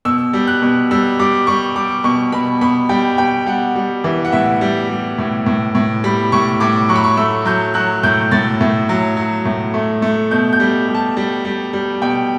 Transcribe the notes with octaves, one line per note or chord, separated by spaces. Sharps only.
B2 E6
G3
F#6
B2
G3 E6
G3 D6
G3 C#6
G3 D6
B2 C#6
B2 B5
B2 B5
G3 G5
B2 G5
G3 F#5
G3
E3
F#5
A2 E5
G3
G3
A2
A2
A2
G3 B5
A2 C#6
A2 D6
F#3 C#6
B5
C#6
A3 E6
F#3 G6
F#3 F#6
A2 G6
A2 A6
A2
F#3
F#3
A2
A3
A3
B2 G6
G6
G3
G3
A5
G3
G3
G3
B2 G5